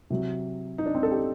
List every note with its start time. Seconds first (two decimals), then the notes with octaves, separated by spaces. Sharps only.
0.10 C3 F#3
0.78 D#4
0.86 D4
0.95 C4
1.03 A4
1.11 G4